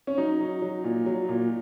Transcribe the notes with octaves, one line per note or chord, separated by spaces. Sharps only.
C#4
F#3 D#4
F#3
F#3
A#2
F#3
A#2